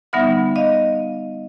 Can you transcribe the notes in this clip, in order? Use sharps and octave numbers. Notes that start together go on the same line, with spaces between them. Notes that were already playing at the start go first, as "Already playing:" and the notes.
D3 G3 B3 D#4 E5 F#5
D#5 F5